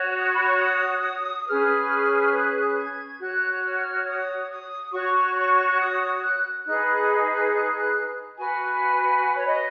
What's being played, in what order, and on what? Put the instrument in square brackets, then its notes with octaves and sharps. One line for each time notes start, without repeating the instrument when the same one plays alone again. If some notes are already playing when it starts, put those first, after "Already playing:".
Already playing: [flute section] F#4 C#5
D#6
C#6
B5
C#6
D#6
C#4 G#4 B4 F6
F#6
G#6
F#4 C#5 F#6
F6
D#6
D#6
F#4 C#5 C#6
C#6
D#6
F#6
D#4 G#4 B4 F#6
F#6
F#6
F#4 B4 G#5
C#5
D#5